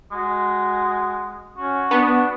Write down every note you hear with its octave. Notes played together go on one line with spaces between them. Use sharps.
G#3 F#4
C#4 F#4
B3 D4